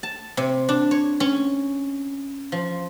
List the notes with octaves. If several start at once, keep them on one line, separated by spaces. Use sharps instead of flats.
A5
C3
D4
C#5
C#4
F3